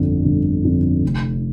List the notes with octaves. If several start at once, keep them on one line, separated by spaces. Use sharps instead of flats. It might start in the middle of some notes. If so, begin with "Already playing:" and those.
Already playing: G1 F2 D3
G1
F2 D3
F1